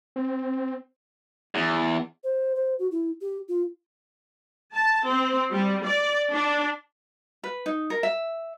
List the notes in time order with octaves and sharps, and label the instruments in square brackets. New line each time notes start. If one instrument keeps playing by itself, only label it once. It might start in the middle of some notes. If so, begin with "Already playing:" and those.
[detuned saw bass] C4
[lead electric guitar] E2
[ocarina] C5
C5
F#4
E4
G4
F4
[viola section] A5
C4
G3
D5
D4
[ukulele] B4
D#4
A#4
E5